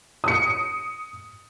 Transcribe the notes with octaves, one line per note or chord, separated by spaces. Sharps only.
D#6 C#7